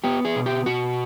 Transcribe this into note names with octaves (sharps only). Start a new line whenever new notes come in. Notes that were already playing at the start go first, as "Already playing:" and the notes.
B3 G4
G#4
B2
G4
B2 F#4